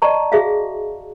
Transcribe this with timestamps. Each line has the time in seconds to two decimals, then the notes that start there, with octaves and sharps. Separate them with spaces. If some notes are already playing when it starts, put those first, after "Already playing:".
0.02 D5 D#5 A5 A#5 C#6
0.32 F#4 G#4 E5 F5